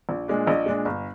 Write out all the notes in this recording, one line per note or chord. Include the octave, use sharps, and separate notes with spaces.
A#1
A#2 G#3 D4
A#1 D#5
A#2 G#3 D4
G1